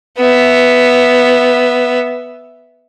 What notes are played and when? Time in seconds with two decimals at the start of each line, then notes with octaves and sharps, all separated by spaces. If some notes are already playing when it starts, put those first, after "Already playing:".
0.18 B3 E5